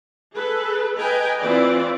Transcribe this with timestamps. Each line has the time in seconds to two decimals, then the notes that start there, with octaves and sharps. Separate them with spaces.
0.34 G#4 A4 B4
0.96 B4 D#5 G5 G#5 A#5
1.41 E3 C4 F4 B4 D5